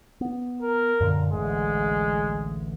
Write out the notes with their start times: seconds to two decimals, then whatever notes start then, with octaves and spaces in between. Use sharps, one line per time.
0.21 B3
0.62 A#4
1.00 F#2 A#2 D3
1.32 A1 D2 G#3